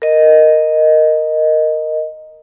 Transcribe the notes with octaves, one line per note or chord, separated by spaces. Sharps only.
A#4 D#5